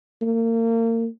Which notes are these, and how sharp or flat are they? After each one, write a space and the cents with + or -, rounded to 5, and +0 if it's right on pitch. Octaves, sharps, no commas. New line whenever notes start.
A#3 -35